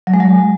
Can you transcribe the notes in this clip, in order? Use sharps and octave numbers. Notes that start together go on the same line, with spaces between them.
F#3
G#3
F#3